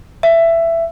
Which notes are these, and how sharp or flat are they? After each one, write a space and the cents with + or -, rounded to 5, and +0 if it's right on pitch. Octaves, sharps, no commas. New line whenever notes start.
E5 +15